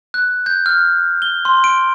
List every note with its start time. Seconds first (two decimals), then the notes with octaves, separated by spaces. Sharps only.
0.14 F#6
0.46 G6
0.66 F6
1.22 G7
1.45 C6
1.64 D7